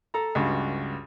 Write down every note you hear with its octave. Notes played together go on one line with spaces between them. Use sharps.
A4 A#5
C#2 G2 F#4